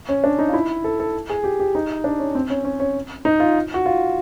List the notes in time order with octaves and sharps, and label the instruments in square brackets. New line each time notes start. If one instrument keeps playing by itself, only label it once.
[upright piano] C#4
D4
D#4
F4
E4
A4
A4
G#4
G4
G4
D#4
D4
C#4
C4
C#4
C#4
C#4
D#4
F4
F#4
F4